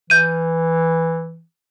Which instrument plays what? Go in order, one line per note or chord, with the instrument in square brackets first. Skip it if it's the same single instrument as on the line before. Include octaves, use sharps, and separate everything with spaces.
[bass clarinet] E3 [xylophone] G6 D#7